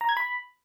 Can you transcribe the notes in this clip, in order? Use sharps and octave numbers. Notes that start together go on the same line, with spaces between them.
A#5
G#6
B5